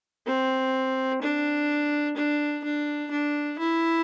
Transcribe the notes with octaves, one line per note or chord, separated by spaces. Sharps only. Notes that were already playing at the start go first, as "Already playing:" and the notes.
C4
D4
D4
D4
D4
E4